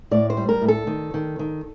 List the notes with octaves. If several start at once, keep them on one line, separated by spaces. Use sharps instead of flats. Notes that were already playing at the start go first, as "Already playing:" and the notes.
A2 D5
C5
G3
A#4
A2
A4
D#3
D#3
D#3